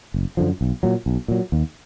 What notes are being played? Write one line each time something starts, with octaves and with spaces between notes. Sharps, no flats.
F#1
F#2 D3 F3
B1
A#2 F#3
B1
A#2 F#3
D#2